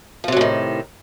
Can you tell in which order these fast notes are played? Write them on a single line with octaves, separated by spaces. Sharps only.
F3 C3 F#3 A2 D#3